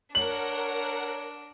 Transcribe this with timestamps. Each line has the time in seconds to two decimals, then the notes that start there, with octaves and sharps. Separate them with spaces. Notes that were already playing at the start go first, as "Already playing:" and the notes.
0.15 D4 A#4 C#5 F#5 A#5 F#7